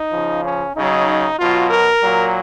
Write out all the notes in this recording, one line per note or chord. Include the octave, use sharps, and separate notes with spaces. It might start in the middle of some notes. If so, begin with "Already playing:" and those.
Already playing: D#4
C#3 F3
C#4
C#3 F#3 D#4
B2 F#3 F4
A#4
A#2 F#3